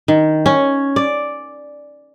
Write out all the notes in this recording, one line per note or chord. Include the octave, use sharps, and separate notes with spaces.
D#3
C#4
D5